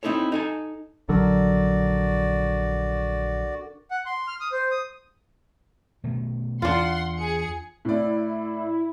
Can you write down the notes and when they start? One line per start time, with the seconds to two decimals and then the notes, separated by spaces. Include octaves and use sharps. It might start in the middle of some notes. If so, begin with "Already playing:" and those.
0.03 C4 D#4 E4 A4 C#5
0.32 D#4 A4 G#5
1.09 A#1 D3 F#3 D4 F#4 A4 A#4 D5
3.91 F#5
4.06 C6
4.27 F6
4.41 D#6
4.52 C5
4.71 D#6
6.04 B2 D#3 A3
6.62 E2 D4 F4 F#5 C6
7.17 G#4 C#7
7.85 A2 E4 D5